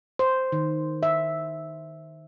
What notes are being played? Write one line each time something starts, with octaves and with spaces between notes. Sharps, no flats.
C5
D#3
E5